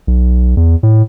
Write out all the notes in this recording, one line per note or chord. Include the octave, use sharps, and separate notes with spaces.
B1
E2
A2